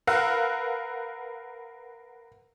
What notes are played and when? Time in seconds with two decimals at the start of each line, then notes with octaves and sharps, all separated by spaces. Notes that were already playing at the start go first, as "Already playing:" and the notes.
0.07 A#4 B4 F5 F#5 E6